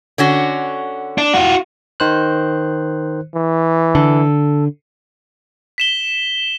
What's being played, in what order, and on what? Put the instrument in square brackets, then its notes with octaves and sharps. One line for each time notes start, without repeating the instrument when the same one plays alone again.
[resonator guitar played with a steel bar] D3 C#4 F#4
[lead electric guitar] D4
F4 F#4
[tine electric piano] D#3 C5 F#6
[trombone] E3
[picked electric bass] D3 [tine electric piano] A4
[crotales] B6 E7 G7